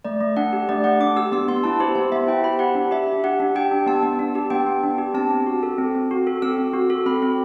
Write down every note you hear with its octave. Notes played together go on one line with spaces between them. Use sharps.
A3 D5
A3
D4 F#5
G4
A3 D5
A3 F#5
D4 D6
G4 E6
B3 E6
B3 C6
E4 A5
G4 C5
B3 C5
B3 E5
E4 G5
G4 B5
G4 F#5
D4
G4 E5
D4
G4 F#5
D4
G4 G5
D4
B3 A5
B3
D4
G4
B3 G5
B3
D4
G4
C4 A5
C4
F#4
A4
C4
C4
F#4
A4
C4 E6
C4
F#4
A4
C4 B5
C4